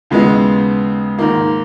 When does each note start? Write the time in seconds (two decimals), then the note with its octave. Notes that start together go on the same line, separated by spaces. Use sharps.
0.10 D#2 C#3 G#3 B3 E4
1.18 G#2 D#3 A#3